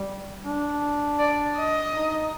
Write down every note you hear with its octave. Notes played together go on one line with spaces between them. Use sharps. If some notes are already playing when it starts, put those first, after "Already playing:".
Already playing: G3
D4
D5
D#5
D#4